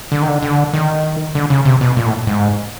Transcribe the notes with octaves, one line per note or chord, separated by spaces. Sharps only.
D3
D#3
D3
D3
D#3
D3
C#3
C3
B2
A#2
A2
G#2